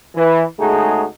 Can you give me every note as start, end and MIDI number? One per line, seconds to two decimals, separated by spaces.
0.16 0.43 52
0.59 1.05 49
0.59 1.05 56
0.59 1.05 57
0.59 1.05 63
0.59 1.05 66
0.59 1.05 68